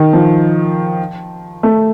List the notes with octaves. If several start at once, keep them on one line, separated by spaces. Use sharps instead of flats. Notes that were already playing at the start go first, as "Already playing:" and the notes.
Already playing: D#3
F3
A3